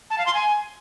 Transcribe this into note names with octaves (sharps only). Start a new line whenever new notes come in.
A5
F5
C6
G#5